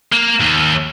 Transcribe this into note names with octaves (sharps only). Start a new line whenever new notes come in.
A#3
D#2